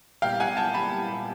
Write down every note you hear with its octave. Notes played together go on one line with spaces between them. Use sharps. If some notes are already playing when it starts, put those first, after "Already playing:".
A#2 G3 B3 E4 G4 F5 G5
F#5 G#5
G5 A5
A5 B5